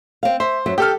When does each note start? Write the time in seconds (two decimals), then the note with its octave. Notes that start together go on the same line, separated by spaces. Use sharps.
0.23 C4 F5
0.40 C5 E5
0.66 F#2 F#3 E5
0.78 G4 A4 G5 F6